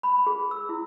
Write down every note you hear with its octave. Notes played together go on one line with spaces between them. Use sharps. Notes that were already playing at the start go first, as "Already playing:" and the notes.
B5
G#4
E6
E4